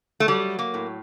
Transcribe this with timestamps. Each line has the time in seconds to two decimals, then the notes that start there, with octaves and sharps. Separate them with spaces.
0.20 A3
0.28 F#3 G3
0.59 A#3
0.74 A2